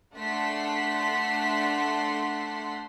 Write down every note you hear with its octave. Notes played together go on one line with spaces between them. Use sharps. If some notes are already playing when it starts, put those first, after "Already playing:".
A3 D4 A4 F#5 C6 B6